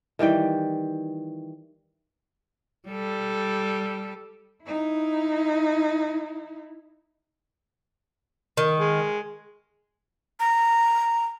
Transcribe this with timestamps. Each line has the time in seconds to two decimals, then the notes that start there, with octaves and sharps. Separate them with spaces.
0.19 D#3 E3 G3 G5
2.89 G3 A4
4.64 D#4 E4
8.57 D#3
8.78 G#3
10.40 A#5